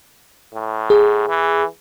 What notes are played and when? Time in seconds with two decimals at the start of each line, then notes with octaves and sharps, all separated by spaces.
0.54 A2
0.90 G#4
1.29 E3